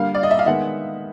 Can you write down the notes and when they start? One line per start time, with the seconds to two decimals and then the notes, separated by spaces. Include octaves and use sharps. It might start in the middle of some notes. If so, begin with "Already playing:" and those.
Already playing: D3 G3 A#3 F5
0.14 D5
0.23 D#5
0.31 E5
0.39 F5
0.46 D#3 G#3 B3 E5 F#5